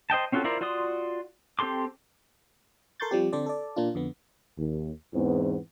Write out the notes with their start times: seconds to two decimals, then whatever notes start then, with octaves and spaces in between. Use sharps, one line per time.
0.10 C5 D#5 G5 A5
0.32 C4 C#4 F4 F#4 A4
0.44 E4 F4 A#4 C5 D5
0.61 F4 F#4 D5 C6 D#6
1.59 C4 G4 A4 C6 D6
3.00 A4 A#4 C6 C#6 G6 A6
3.11 F3 G3 C4 G4
3.33 D3 C4 A4 C5 D5
3.46 A4 D5
3.76 A#2 A#3 D4 F4
3.95 F2 D3 B3
4.57 D#2
5.14 E2 G#2 E3 B3 C4